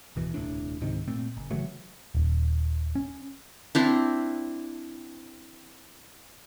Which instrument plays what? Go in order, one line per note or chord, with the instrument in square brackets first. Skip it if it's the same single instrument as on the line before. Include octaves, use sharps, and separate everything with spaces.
[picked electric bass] D1 B2 E3
D#1 C2 A2 D4
C#2 G#2 C3 D#3
A#2 A3 C4
F#1
C#3 E3 F#3 A3
D#1
C#4
[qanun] C4 D4 E4